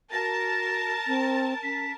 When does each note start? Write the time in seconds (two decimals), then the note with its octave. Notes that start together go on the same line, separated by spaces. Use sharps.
0.12 F#4 A#4 A5 A#6
1.07 C4
1.63 C#4 B6